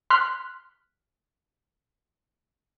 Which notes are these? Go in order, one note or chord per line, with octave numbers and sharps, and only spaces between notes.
C6 F6 F#6 B6